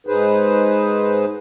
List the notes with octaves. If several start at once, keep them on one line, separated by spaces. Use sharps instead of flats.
G#2 D#4 G#4 B4 C5